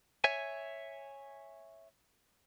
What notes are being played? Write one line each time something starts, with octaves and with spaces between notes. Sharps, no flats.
C#5 E5 G#5